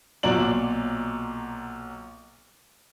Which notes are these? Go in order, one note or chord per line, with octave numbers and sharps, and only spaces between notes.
B1 A#2 F#3 D5 F#7